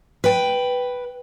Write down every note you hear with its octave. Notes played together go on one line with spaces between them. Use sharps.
B4 G5